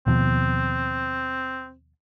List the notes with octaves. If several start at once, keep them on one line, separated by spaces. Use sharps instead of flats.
D#2 B2 F3 C4